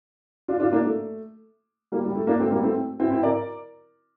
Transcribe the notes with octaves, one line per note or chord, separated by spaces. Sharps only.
D4 F4
D4 F4
A#3 D4
A3
G3 A#3
G3
A3
A#3 D4
A3 C4
G3 A#3
A3 C4
C4 E4
C4 E4
A#4 D5